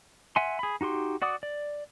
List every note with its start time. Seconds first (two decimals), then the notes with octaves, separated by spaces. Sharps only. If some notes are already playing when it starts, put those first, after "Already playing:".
0.36 E5 F#5 G#5 C6
0.59 G#4 B5
0.81 D#4 F#4 G4 C6
1.22 F#4 D5 F#5 D6 D#6
1.43 D5